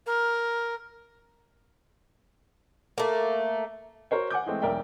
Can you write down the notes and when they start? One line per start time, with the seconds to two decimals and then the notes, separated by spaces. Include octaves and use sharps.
0.06 A#4
2.98 A3 A#3
4.11 F#4 A#4 C5 C#5
4.30 F#5 G#5 D6 G6
4.46 E3 G#3 A3 C4
4.62 E1 B1 A#4 D5 E5 G5